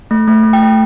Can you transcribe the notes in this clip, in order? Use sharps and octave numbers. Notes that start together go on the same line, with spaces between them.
A3
A3
A3
G5
A3